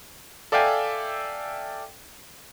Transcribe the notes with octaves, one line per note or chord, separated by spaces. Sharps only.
A4 D5 E5 F5 G5 G#5